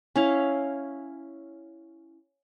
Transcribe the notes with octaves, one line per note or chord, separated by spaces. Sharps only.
C#4 E4 F5